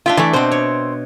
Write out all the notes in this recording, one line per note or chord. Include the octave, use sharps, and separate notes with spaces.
D4 F4 E5 G5
E3 A3 D5 E5
B2 C4 C5
C#5